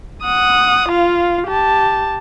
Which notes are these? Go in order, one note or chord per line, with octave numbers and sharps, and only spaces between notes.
F#5 D#6
F4 F5
G4 A5